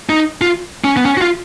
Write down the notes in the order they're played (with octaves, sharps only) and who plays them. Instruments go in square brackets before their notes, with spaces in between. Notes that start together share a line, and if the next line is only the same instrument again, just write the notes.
[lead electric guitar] D#4
F4
C#4
B3
C#4
F#4
F4